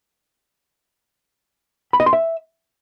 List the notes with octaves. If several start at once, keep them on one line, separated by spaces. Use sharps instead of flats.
B5
D#5
C6
E5